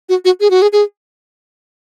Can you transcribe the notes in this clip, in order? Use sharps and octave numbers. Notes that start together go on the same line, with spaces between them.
F#4
F#4
G#4
F#4
G#4
G#4